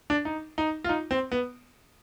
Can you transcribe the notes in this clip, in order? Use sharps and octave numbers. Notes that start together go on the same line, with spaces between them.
D4
D#4
D#4
F4
D#4
C4
B3